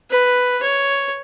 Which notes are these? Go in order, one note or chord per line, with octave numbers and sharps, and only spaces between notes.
B4
C#5